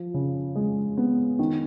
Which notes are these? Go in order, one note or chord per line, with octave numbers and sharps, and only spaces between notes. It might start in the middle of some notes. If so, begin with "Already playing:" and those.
Already playing: F3
C#3
G#3
B3
D#3